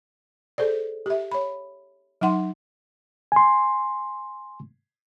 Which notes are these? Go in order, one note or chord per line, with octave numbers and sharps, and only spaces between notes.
G#4 A4 C5 D5
G4 E5
C#5 B5
F#3 D#4 F#5 C6
G#5 C6